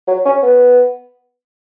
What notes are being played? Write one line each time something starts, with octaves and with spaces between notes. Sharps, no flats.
F#3
C#4
B3